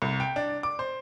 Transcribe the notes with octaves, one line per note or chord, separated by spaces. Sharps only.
C2
G5
D4
D6
C5